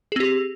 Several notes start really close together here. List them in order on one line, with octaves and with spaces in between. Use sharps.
G#4 C4 G4